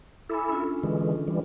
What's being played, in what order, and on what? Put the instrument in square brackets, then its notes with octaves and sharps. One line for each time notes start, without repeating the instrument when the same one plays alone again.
[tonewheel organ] E4 A4 [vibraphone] G#5 B5 D6
[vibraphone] C#4 D4 F4
[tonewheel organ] D3 E3 G#3
E3 G3